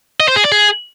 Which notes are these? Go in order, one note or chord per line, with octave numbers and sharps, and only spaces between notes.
D#5
C5
G#4
D5
G#4